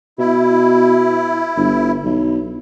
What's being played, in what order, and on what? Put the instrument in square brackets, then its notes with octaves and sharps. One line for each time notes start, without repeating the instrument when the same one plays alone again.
[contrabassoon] B2 [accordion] E4
[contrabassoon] G1
B1